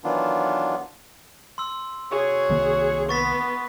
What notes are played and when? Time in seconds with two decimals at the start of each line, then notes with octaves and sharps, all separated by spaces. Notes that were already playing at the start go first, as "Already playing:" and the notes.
0.04 D#3 E3 F#3 B3 D4 F4
1.58 C6 E6
2.12 C3 F#4 G#4 C#5
2.49 C2 D#3 A#3
3.09 B3 C#6 A6 B6